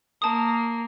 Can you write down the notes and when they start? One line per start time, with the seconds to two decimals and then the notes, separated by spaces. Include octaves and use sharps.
0.22 A#3 A5 D#6